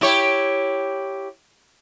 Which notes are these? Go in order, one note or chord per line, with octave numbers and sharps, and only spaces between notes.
E4 G4 C#5